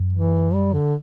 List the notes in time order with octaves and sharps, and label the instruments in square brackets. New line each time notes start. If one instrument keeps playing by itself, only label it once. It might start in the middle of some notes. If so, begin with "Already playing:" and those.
Already playing: [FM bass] F#2
[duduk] E3
G3
D3